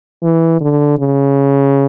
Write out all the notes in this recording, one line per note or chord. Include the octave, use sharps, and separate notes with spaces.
E3
D3
C#3